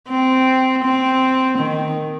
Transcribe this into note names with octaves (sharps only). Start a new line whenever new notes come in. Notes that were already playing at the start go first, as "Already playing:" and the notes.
C4
C4
D#3